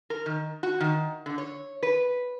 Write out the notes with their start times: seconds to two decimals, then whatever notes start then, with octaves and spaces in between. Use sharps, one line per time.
0.10 A#4
0.26 D#3
0.63 F#4
0.80 D#3
1.26 D3
1.38 C#5
1.83 B4